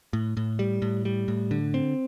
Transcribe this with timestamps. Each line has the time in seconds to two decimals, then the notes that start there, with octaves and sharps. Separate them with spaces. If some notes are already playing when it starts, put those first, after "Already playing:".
0.13 A2
0.37 A2
0.59 G3
0.82 A2
1.05 G3
1.28 A2
1.51 D3
1.74 C4